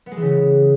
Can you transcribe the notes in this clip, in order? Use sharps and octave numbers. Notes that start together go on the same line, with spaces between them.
B3
G#3
E3
C#3